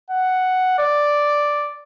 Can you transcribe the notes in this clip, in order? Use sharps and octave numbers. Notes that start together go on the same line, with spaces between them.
F#5
D5